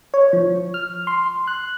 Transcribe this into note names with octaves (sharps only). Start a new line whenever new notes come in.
C#5
F3
F6
C6
F#6